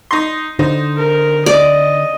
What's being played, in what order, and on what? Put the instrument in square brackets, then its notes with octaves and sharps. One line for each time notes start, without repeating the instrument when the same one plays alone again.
[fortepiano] D#4 C6
[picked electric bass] D3 [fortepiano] D#4 C5
[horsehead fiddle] A#4
[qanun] D5 [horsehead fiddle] D#5